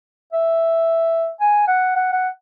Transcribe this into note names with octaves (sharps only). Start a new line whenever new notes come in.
E5
G#5
F#5
F#5
F#5